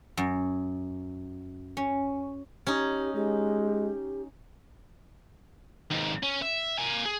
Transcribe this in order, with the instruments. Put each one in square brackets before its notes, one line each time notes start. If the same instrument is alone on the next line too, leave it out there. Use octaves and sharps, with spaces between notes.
[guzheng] F#2
C#4
[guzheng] C#4 D#4 [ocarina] G4
[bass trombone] G#3 [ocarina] G4
[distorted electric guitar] D#2 G#2
C#4
E5
A#3 G#5
G#4